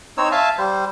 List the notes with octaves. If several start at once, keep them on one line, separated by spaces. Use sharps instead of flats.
C4 D#4 C#5 E6
E5 F5 G#5 A5
G3 C5